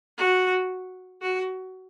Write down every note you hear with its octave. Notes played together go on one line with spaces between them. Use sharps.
F#4
F#4